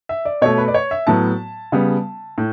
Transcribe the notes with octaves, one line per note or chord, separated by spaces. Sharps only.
E5
D5
B2 A3 C#5
B4
D5
C#5
E5
A2 F#3 B3 A5
C#3 G3 B3
A2